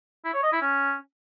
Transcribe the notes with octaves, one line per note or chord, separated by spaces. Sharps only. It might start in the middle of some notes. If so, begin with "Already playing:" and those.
E4
C#5
D#5
E4
C#4